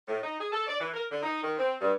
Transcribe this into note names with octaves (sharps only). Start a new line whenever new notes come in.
A2
D#4
G#4
A4
D5
E3
A#4
D3
D#4
D#3
C4
G2